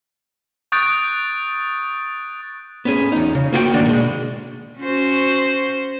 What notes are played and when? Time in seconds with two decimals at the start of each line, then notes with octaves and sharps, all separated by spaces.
0.72 C#6 D#6 F#6 G6 A6 D7
2.85 B3 C#4 G#4
3.12 E2 D#4
3.35 C#3
3.53 A#3 F#4 B4 G5
3.73 G#2 D#3 A#3 D4 F#4
3.86 B2 G#3
4.79 C#4 F#4 C5